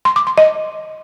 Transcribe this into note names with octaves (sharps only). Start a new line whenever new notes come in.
C6
D6
C6
D#5